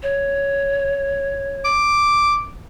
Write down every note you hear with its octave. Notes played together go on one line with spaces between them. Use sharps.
C#5
D6